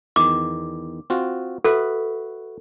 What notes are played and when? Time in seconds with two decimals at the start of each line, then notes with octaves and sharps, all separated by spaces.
0.16 E2 D#3 D6
1.10 C4 F4 F#4
1.64 F#4 A4 B4 E5